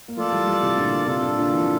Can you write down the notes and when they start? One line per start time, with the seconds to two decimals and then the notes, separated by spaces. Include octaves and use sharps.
0.08 A#3
0.17 F3 A3 F4 A4 D5 A5
0.32 E3 G3
0.46 E3 G3
0.62 C3 E3
0.77 A#2 D3
1.06 C3 D4 F4 A4
1.22 C3
1.37 A#2 D3
1.52 E3
1.60 F3